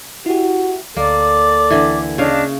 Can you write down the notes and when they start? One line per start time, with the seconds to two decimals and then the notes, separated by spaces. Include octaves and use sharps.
0.26 E4 F#4 G4
0.97 D2 A#3 A4 D5 D6
1.70 D3 E3
2.18 C#3 D4 D#5 F5